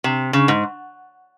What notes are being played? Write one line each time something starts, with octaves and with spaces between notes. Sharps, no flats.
C3
C#3
G#2